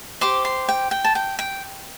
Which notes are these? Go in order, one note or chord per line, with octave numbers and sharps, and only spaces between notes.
G4 C5 D6
C6
G5
G5
A5
G5
G5